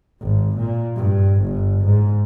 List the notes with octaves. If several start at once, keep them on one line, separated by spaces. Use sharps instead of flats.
G#1
A#2
G2
G1
G#2